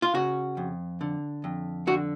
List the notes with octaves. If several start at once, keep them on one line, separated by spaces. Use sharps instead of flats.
F4
C#3 F#4
F2
D3
F2
D3 F#4